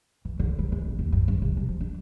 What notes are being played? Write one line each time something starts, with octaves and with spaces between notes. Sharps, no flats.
E3
D3
G3
G#3
A1
D#2
G2
G2
C3
G3
F3
D4